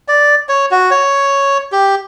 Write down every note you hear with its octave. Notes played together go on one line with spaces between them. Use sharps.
D5
C#5
F#4
C#5
G4